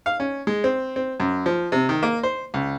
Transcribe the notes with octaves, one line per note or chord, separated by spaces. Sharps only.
F5
C#4
G#3
C4
C4
F#2
F3
C3
D#3
A#3
C5
C#2